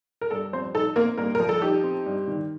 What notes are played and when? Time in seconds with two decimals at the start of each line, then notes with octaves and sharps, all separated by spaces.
0.21 A#4
0.31 G2 A4
0.53 F3 C4 C5
0.75 D#4 A4
0.96 A#3 C4 A#4
1.18 G2 A#3 A#4
1.35 F3 A#4
1.49 A4
1.62 D#4 G4
1.83 C4
2.06 G2
2.27 D#3